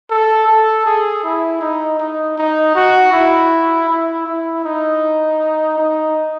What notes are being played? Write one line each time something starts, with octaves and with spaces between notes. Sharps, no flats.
A4
A4
G#4
E4
D#4
D#4
D#4
F#4
E4
E4
E4
D#4
D#4